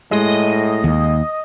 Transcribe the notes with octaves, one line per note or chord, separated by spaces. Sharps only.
A2 G#3 D#5
D#2